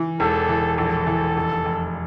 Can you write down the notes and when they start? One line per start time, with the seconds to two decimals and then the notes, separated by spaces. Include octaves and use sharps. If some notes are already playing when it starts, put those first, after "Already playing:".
Already playing: E3
0.20 E1 A4
0.49 E3
0.78 A#1 A4
1.07 E3
1.36 F1
1.65 F1